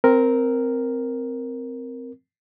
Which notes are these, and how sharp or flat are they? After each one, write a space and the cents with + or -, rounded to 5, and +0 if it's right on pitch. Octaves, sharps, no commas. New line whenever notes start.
C4 -10 A#4 +0